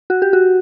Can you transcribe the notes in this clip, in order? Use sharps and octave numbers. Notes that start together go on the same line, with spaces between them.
F#4
G4
F#4